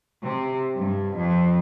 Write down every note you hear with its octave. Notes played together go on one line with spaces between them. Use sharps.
C3
G2
F2